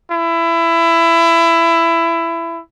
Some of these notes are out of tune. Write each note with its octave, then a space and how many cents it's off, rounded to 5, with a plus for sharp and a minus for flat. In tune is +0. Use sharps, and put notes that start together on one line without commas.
E4 +20